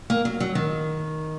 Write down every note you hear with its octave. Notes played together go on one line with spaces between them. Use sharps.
A#3
F#3
F#3
D#3